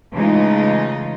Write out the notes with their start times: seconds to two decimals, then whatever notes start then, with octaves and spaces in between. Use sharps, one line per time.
0.14 C#3 E3 G#3 A3 D#4 F4